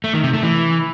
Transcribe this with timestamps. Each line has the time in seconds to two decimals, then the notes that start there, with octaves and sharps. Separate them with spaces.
0.04 A3
0.14 D#3
0.24 C3
0.33 A3
0.43 E3